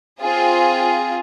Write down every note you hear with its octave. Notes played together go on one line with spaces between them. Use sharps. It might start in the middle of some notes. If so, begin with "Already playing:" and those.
C4 F4 G#4